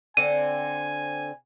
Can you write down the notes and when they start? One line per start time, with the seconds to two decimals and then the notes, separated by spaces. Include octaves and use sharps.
0.17 D3 C4 G#5 D#7